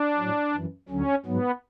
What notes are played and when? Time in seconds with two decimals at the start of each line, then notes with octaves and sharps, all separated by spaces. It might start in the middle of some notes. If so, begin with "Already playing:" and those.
Already playing: D4
0.17 A2 F#3
0.53 F#2 E3
0.89 D2 D3 F#3 C#4
1.26 G#2 F#3 B3